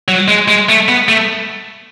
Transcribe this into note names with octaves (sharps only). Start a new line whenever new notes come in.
F#3
G#3
G#3
A3
B3
A3